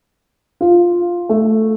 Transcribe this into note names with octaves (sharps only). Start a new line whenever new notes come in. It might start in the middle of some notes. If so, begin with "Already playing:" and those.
F4
A3